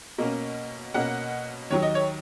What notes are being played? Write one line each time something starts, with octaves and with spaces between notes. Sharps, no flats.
B2 A#3 C#4
B2 A#3 C#4 F#5
D#2 D#3 F#3 C#5
D#5
C#5